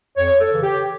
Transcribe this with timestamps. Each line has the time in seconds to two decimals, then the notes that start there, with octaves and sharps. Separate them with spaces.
0.18 F2 C#5
0.41 A4
0.52 C#3 E3
0.63 G4